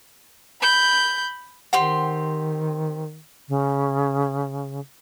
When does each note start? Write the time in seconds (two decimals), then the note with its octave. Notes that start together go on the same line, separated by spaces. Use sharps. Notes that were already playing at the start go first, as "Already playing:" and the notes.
0.61 B5 G6
1.73 D#3 C4 G4 F#5 C6
3.49 C#3